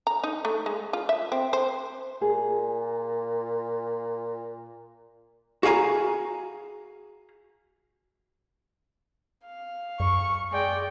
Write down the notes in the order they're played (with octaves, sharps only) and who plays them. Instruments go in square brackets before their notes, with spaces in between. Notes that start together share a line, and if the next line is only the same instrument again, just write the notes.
[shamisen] A#5
D#4
A3
G#3
F4
E5
C4
C5
[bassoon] A#2 [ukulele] G#4
[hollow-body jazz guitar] F#4 G#4 F5 G#5 A#5
[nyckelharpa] F5
[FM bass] F#2 [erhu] C#6
[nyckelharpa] G#3 G5 [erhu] D5